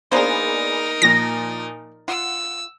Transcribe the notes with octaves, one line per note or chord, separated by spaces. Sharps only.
A#3 B3 D4 D#4 G#4 A#4 C5
A#2 F3 A#6
F4 F#5 E6